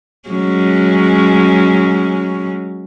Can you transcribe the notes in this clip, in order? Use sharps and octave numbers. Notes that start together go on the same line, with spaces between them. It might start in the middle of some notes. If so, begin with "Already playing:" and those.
F#3 G#3 C#4